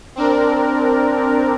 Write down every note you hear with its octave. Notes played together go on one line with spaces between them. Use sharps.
C4 D4 A#4